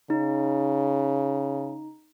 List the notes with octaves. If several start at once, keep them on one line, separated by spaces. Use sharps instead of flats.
C#3 D#4